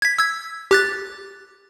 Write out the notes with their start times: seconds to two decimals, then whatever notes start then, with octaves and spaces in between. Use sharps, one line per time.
0.02 G#6 B6
0.19 E6 G#6
0.71 G4 F#6 A6